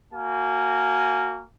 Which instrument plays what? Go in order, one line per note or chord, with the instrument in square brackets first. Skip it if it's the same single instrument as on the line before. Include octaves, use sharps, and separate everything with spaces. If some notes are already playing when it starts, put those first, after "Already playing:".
[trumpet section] A#3 F#4 G#5